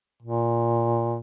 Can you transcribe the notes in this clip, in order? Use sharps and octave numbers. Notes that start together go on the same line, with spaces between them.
A#2